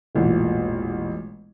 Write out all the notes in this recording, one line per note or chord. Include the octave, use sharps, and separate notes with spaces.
E1 A1 A#2 E3